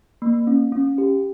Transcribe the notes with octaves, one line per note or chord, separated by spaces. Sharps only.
A#3
C#4
C#4
G4